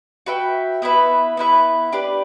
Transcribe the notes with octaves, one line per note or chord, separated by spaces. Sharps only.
F#4 B4 E5 G5
B3 E4 B4 E5
B3 E4 B4 E5
D4 G4 B4 D5